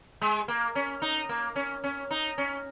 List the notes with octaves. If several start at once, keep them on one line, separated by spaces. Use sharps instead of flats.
G#3
A#3
C#4
D#4
A#3
C#4
C#4
D#4
C#4